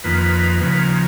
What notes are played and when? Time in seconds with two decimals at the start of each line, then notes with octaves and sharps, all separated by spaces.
0.04 F2 D#3 A#3 B4
0.61 D#2 C#3 F3 A#3 B4